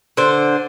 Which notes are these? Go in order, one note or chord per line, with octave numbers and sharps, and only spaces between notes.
D3 C5